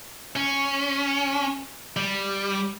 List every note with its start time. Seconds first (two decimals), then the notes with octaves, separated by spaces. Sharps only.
0.36 C#4
1.97 G3